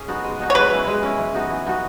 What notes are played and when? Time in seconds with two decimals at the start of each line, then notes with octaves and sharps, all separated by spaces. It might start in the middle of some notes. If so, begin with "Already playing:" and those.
Already playing: C#4 G#4
0.08 B3 D#4 F#4
0.24 G#3
0.39 B3 D#4 F#4
0.50 C#5
0.55 G#3 B4
0.71 C#4 E4
0.87 G#3
1.03 C#4 E4
1.18 E3
1.34 B3 D#4 F#4
1.50 E3
1.66 B3 D#4 F#4